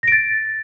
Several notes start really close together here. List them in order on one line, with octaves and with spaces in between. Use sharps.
A#6 D7 A6